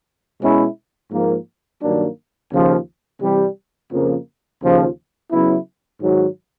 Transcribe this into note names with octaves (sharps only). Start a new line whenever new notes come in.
B2 G#3 C#4 E4
G#2 F3 A#3
G2 D#3 F#3 A#3 D4
D#2 C#3 F3
C3 E3 G3
F2 C#3 F3 A#3
D#2 C#3 F3
C#3 F#3 B3 E4
G#2 D#3 F#3